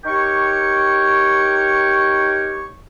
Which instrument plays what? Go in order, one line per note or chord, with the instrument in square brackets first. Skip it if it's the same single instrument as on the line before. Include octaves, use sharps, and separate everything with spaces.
[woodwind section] D#4 G4 A#4 C#5 G5 C#6